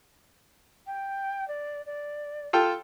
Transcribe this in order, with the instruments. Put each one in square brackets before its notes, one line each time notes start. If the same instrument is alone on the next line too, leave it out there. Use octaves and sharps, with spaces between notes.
[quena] G5
D5
D5
[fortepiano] F4 A4 G5